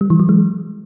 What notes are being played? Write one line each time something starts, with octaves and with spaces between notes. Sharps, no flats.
G3
E3
F#3
G#3